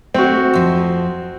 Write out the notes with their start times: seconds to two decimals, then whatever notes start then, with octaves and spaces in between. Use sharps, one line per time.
0.14 A3 C4 F#4
0.54 F2 F3